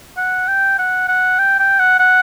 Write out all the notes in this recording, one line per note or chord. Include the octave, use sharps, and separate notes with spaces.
F#5
G5
F#5
F#5
G5
G5
F#5
F#5